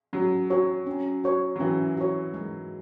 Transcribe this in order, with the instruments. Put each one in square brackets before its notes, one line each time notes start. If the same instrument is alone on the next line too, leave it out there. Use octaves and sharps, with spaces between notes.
[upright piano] F#3 [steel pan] C#4
[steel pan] F#4 C#5
C#4
F#4 C#5
[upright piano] F#3
[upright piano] E3 [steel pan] C#4
[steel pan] F#4 C#5
G#3